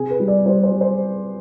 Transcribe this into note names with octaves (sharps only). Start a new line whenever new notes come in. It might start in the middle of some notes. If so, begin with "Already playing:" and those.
Already playing: C3 G#4
B4
G3
D5
G3 C5
C5
G3
C5